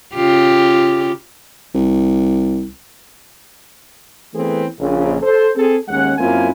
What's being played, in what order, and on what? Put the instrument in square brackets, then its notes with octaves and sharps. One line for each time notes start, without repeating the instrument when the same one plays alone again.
[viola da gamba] C#3 F4 G4
[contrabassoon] C2
[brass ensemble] E3 A3 B3 C4 G#4 B4
A#1 C#3
A4 C5
C4 G#4 A4
D#2 G#3 C#4 F#5
F#2 A#3 C4 E4 F4 G#5